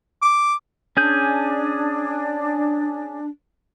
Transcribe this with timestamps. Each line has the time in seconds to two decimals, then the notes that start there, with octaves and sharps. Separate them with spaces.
0.22 D6
0.97 C#4 D4 G#4 G6